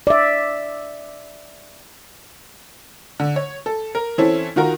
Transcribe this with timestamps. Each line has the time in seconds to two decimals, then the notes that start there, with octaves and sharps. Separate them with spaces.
0.07 D5 E5
3.20 D3
3.36 C#5
3.66 A4
3.95 A#4
4.18 E3 C4 C#4 E4 A4
4.56 D#3 F4 F#4 A#4